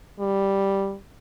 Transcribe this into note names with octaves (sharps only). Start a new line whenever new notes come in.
G3